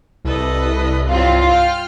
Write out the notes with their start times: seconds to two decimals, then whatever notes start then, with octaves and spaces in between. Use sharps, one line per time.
0.24 C2 A4 B4 D#5
1.10 G2 F#3 C4 F4
1.49 G5 F6